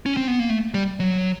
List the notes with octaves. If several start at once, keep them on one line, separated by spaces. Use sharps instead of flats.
C#4
C4
B3
A#3
A3
G3
F#3